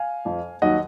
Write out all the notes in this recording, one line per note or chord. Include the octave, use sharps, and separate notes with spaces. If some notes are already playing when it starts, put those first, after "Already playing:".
Already playing: F5 G#5
F2 F3
D#2 D#3 F#3 D#5 F#5